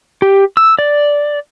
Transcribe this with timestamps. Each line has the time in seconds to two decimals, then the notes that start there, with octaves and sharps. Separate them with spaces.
0.22 G4
0.57 E6
0.79 D5